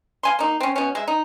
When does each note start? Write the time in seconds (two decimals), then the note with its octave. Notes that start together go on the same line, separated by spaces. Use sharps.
0.23 F5 G#5 C6
0.39 A#3 D#4
0.60 C4 C#4
0.76 B2 C#4
0.95 G#3 E5
1.08 D#4